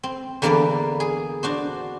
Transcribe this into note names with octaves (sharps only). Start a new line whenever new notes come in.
C4
E2 D3 A#3 A#4 B4 D5
G#4
D4 F#4 C5